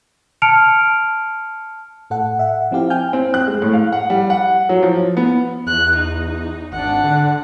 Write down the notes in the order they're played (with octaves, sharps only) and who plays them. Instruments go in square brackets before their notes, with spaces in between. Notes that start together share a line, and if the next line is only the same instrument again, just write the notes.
[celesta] A5 F6 C#7 D7 F7
[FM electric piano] A2 A4 F#5
E5 F#5
F3 C4 E4 G4 F5
G5 G#5 F6 G6
[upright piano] C4
F#6
G#3
A2
F5
F#5
G3
F#5
F#3
F3
B3
[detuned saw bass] E2 [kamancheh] F#6
[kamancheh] D#4
[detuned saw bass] G#1 [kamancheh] D4 F#5
[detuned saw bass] D3